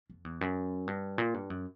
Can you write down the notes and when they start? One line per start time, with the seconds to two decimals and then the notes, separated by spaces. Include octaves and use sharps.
0.10 F2
0.25 E2
0.41 F#2
0.87 G2
1.18 A#2
1.34 G2
1.50 F#2